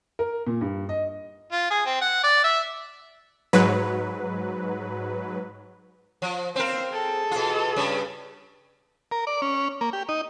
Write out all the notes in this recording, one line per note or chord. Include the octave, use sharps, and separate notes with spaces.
A#4
A#2
G2
D#5
F4
G#4
C4
F#5
D5
E5
G#2 F#3 B4
F3
C4 A#4 C5 F5
G#4 A4
B2 F4
G2 C#3
A#4
D5
C#4
A#3
G4
D#4